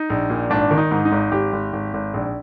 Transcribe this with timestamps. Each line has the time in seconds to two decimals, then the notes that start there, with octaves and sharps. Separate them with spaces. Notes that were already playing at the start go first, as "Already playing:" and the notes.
Already playing: D#4
0.10 A#1
0.30 A#2
0.50 G#1 D4
0.71 D#3
0.78 D#4
0.91 G#2
1.05 D#4
1.12 G#1
1.32 G#1 G4
1.53 G#1
1.73 G#1
1.94 G#1
2.14 A#1